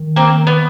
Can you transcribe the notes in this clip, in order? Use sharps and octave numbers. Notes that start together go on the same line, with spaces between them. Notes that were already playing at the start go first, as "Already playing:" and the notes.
Already playing: D#3
A#3 C4
B3